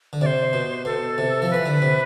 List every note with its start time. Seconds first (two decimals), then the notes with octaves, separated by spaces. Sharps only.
0.13 D3
0.21 C3 C5 D5
0.53 B2
0.85 B2 A4
1.18 C3
1.42 F3
1.50 E3 B4
1.66 D3
1.82 C3